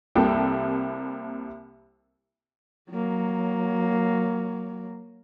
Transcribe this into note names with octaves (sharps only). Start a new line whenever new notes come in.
C2 C3 G3 A#3 A4 G5
F#3 A#3